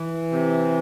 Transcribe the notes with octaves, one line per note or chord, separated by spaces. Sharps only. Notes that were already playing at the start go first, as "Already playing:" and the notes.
Already playing: E3
C3